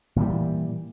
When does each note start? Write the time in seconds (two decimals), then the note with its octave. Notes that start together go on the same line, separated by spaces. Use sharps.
0.16 A#2 E3 F#3 G3